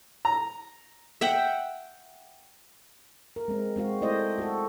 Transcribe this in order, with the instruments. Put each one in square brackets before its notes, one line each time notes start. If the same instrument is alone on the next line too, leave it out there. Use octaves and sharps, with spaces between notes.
[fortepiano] A#5
[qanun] E5 F#5 G5
[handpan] A#4
G#3 C4
G#3 C4 F#4 F5
A3 E4 C5 D5 D#5
F#4 A4